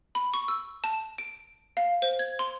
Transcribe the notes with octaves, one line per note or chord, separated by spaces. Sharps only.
B5
C#6
E6
A5
D7
F5
C5
G#6
C6